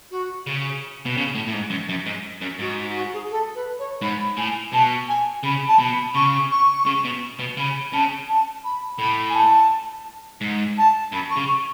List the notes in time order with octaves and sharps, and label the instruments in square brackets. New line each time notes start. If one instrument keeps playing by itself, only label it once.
[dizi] F#4
[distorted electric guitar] C#3
B2
C#3
A2
A2
G#2
F#2
F#2
G#2
F#2
[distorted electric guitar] G#2 [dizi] F#4
[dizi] F#4
F#4
G#4
A4
B4
C#5
[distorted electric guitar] G#2 [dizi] B5
[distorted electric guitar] A2 [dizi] G#5
[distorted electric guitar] B2 [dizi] A5
[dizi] G#5
[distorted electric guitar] C#3 [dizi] B5
[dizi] A5
[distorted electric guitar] B2
[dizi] B5
[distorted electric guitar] C#3 [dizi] C#6
[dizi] C#6
[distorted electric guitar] C#3
B2
B2
[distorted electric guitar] C#3 [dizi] B5
[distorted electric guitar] C#3 [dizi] A5
[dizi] A5
B5
[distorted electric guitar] A2 [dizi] B5
[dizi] G#5
A5
[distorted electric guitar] G#2
[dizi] A5
[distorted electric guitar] F#2 [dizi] B5
[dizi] C#6
[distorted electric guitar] C#3
[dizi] C#6